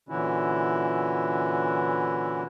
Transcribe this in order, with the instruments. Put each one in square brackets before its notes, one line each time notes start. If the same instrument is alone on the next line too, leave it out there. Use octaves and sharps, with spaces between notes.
[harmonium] A#2 D3 E3 C#4 E4 F#4